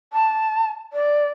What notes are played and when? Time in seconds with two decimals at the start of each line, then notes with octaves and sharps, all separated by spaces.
0.13 A5
0.93 D5